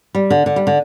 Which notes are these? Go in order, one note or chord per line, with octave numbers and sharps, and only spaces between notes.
G3
D3
D3
G3
D3